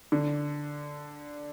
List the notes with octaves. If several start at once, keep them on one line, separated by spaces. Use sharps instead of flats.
D3